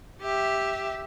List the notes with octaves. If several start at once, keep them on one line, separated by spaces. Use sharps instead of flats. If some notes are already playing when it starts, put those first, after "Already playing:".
G4 E5